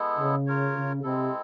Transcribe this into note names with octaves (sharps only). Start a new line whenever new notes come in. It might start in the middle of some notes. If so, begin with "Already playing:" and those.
Already playing: G#3 B3 E4 A4
C#3
F4 A#4 C#5
C#3
C3 G#3 C4 E4 A4